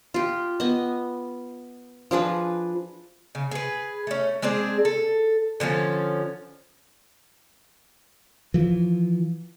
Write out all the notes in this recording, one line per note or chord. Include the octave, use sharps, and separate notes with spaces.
F4 G4
B3 D#5
F3 D4 G#4 B4
C#3
G#4 B4
A3 C#4
G#3 C4 D4 G#4
A4
D3 F3 C4 C#4
E3 F3